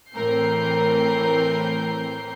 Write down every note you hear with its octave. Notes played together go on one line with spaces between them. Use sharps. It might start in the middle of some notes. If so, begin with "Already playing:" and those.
A2 E3 C4 A#4 G6 C7